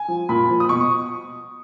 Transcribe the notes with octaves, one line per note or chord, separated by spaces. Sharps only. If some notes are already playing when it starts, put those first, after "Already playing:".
Already playing: G#5
F3
A#2 B5
F3
D#6
B2 C#6